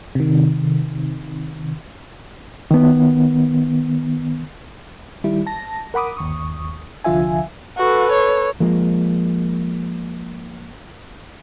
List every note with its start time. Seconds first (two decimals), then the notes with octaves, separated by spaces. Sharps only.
0.15 C3 D#3
2.71 D#3 B3
5.24 D#3 G3 E4
5.46 A5 A#6
5.94 A#4 F#5 B5 D6 D#6
6.17 G1 D#2 C#6 D#6
7.04 C2 D3 F3 F4 E5 G#5
7.78 F#4 A4 B4
8.12 C#5
8.60 F3 G#3 A#3